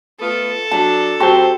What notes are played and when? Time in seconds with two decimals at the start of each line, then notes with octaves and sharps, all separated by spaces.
0.20 A3 B3 F4 A4
0.71 F#3 D4 A5
1.20 F#3 C4 F#4 G4 C5 A5